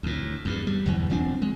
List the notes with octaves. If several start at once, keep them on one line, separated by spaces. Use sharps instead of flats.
D2 A2
E2 G2
G3
G1 E2 E3
E1 F3 C4 D4
G#3